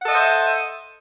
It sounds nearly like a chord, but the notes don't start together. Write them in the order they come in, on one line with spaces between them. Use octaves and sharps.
F#5 A4 D#5 E5 C5